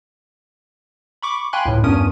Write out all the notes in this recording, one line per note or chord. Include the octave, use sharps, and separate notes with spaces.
B5 C#6 D6
F5 G5 G#5 B5 C6 F#6
C#2 A2
E2 G2 C#4 A#4 D#6 D#7